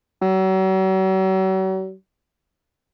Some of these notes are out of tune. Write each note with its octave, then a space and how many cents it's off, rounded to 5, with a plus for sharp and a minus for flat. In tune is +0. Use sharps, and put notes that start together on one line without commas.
F#3 +40